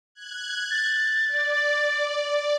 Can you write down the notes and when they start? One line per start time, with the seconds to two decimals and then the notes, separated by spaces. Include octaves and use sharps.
0.14 F#6 G#6
0.71 A6
1.28 D5